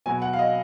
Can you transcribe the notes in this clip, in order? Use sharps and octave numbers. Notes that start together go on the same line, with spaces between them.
B2 F#3 B3 G#5
F#5
F5
D#5